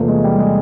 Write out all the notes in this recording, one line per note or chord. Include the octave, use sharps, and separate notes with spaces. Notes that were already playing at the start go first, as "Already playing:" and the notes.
Already playing: E2 C3 F3 A3 A#3
G#3
G3
G#3